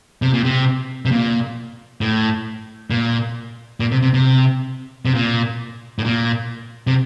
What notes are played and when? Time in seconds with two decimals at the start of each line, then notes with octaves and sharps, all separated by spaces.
0.22 C3
0.33 A#2
0.44 C3
1.05 C3
1.11 A#2
2.01 A2
2.90 A#2
3.80 A#2
3.92 C3
4.02 C3
4.14 C3
5.05 C3
5.15 A#2
5.99 A2
6.04 A#2
6.87 C3